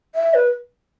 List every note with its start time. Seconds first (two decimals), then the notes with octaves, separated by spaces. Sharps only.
0.15 E5
0.34 B4